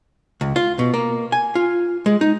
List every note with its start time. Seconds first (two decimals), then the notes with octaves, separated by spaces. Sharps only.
0.41 C#2
0.56 F4
0.79 B2
0.94 A#3
1.32 G#5
1.55 F4
2.06 G#3
2.21 D#4